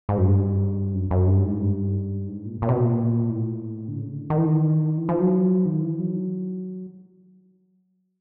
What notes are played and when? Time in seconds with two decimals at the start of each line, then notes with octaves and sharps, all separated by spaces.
0.09 G#2
0.18 F#2
0.26 G2
0.94 F#2
1.11 F#2
1.27 G2
1.44 G#2
1.61 G2
2.28 G#2
2.45 A#2
2.62 A#2
2.69 C3
2.73 B2
2.85 A#2
3.29 A2
3.88 D3
3.97 C#3
4.14 D3
4.30 D#3
4.38 E3
4.45 D#3
4.98 E3
5.09 F3
5.20 F#3
5.65 D#3
5.82 E3
5.99 F#3